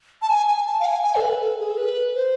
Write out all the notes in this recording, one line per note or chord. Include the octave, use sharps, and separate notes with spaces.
A5
G#5
G#5
A5
F5
G#5
G#5
A4
B4
A4
G#4
A4
B4
C5